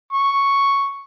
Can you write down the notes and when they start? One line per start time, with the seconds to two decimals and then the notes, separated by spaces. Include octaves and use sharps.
0.13 C#6